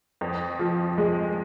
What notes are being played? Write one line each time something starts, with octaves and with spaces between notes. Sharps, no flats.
F2
F3
G#3